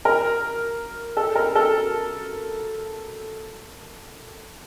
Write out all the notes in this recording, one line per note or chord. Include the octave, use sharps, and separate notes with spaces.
A#4
A4
A#4
A4